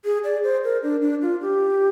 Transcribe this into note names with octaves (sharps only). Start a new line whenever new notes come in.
G#4
D5
C5
A#4
D4
D4
F4
G4